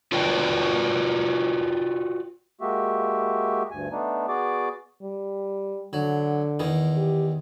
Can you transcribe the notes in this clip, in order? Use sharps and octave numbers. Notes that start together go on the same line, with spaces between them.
F4 F#4 B4 D5 G5
G#3 A#3 F#4 G4 E5
D2 G2 G#5
A3 B3 D4 D#4
B3 F#4 G#4 D5 D6
G3
D3 F#3
E2 D#3
G4